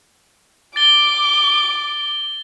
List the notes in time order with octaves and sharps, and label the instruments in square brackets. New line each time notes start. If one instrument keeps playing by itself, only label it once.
[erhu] D6 [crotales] A6 G7